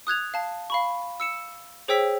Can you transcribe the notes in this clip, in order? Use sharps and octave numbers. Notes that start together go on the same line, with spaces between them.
D#6 F#6 G#6 F7
F5 A5
F5 B5 C#6
E6 C#7 E7
G#4 C5 C#5 G5 E6 B6